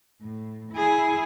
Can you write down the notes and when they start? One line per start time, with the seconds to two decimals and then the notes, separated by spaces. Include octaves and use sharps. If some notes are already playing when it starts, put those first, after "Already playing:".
0.22 A2
0.72 E4 G#4